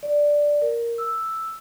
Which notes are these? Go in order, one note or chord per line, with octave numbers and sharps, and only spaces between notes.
D5
A#4
E6